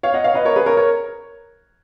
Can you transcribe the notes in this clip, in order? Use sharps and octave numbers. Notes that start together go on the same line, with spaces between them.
C#5 F5
D#5 F#5
C#5 F5
B4 D#5
A#4 C#5
G#4 B4
A#4 C#5
A#4 C#5